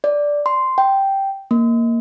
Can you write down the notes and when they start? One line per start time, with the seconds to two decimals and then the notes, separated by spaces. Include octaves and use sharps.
0.04 D5
0.46 C6
0.78 G5
1.51 A#3